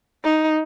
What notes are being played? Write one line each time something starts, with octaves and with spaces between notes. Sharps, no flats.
D#4